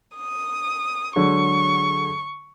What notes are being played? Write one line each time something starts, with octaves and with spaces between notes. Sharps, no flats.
D#6
D3 F#3 G#3 C#6